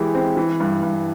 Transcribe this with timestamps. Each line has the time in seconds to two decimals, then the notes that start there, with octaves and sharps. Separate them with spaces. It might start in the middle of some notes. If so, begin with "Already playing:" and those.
Already playing: E3 G#3 G4
0.15 C4
0.37 E3
0.60 G2
0.82 G2